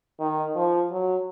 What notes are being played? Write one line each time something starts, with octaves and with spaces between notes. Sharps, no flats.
D#3
F3
F#3